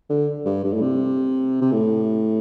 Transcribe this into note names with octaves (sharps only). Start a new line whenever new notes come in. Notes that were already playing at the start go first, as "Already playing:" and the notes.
D3
G2
G2
A2
C3
C3
A2